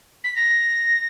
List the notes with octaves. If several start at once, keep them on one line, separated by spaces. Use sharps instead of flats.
B6
A#6